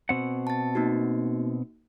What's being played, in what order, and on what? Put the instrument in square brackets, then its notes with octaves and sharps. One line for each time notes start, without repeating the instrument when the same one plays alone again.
[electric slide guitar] B2 C4 F#5
[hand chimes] A5 A6
A#3 D#4 F#4